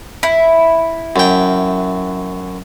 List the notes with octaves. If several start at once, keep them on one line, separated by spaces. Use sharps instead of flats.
E4
F#2 G5